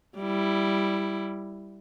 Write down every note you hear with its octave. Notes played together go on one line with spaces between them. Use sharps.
G3 E4